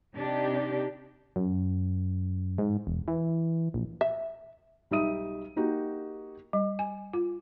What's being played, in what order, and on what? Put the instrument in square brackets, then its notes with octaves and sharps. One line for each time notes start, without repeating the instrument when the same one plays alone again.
[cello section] C3 D4 D#4 G4
[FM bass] F#2
G#2
E1
E3
A#1
[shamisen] E5
[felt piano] B1 G3 D#4 E5 D#6 D#7
A#3 D#4 F#4 G4
[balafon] G3
G#5
F4